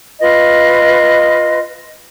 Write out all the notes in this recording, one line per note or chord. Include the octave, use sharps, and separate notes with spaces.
F4 B4 D#5